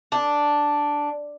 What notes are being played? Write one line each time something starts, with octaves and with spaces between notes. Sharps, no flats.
D4